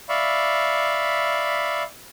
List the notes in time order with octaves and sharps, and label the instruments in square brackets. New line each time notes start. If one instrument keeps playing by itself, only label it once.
[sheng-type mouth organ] D5 E5 F5 B5 C#6